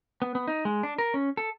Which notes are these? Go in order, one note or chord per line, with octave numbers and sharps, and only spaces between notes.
B3
B3
D#4
G#3
D4
A#4
C#4
A4